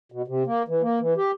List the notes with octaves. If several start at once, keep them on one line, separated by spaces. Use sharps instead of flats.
B2
C3
A#3
E3
A#3
E3
G4